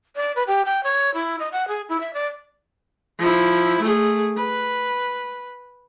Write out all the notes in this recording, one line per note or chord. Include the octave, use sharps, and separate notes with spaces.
D5
B4
G4
G5
C#5
E4
D#5
F#5
G#4
E4
E5
D5
F3 E4
A3 G#4
B4